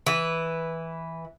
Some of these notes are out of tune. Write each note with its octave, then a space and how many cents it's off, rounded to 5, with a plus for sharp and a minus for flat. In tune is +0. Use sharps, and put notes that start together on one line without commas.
E3 -5 B4 +0